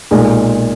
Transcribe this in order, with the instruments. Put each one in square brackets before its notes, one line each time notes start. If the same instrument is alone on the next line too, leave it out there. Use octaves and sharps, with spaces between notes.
[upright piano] B1 A#2 G#3